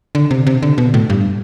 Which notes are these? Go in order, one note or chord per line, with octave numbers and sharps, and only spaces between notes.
D3
C3
C3
D3
B2
A2
G2